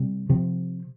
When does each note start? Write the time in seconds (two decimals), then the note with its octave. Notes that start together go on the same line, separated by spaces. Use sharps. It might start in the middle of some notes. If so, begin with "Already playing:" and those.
Already playing: C3 G3 C4
0.29 C3 F3 C4